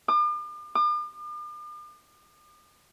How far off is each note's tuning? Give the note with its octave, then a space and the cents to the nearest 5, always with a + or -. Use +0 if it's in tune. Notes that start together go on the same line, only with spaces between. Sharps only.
D6 +45
D6 +45